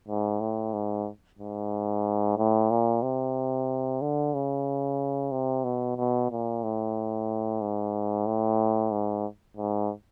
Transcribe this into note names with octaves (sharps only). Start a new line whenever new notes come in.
G#2
A2
G#2
G#2
A2
A#2
C3
D3
C#3
C3
B2
B2
A#2
A2
G#2
A2
G#2
G#2